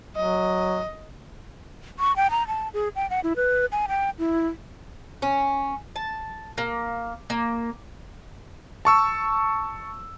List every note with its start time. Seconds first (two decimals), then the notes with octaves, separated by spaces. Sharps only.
0.16 F#3 D#5
1.99 C#6
2.16 G5
2.30 A#5
2.47 A5
2.74 G#4
2.96 G5
3.10 F#5
3.24 E4
3.36 B4
3.72 G#5
3.88 G5
4.19 E4
5.22 C#4
5.96 A5
6.58 A#3
7.30 A#3
8.85 A5 C#6 E6